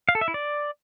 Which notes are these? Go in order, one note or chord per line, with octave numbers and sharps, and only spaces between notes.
F5
A4
E5
E4
D5